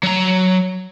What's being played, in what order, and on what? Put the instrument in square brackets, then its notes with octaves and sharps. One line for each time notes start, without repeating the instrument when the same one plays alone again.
[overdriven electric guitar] F#3 A#5